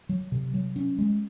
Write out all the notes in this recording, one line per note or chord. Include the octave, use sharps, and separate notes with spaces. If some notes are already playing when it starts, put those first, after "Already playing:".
F#3
C3
F#3
C#4
G#3